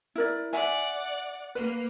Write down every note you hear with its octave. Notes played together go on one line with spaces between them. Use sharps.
E4 A#4 D5
D5 E5 F#5 G#5
A#3 B4